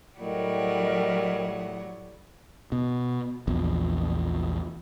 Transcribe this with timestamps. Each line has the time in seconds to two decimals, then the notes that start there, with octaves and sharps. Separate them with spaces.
0.20 A2 F#3 G3 A#4 D#5 F#5 G5
2.72 B2
3.48 A#1 E2